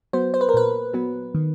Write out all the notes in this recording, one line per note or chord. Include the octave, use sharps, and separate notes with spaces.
F#3 B3 C5
C5
B4
A#4
A#2 B4
F#3 B3
D#3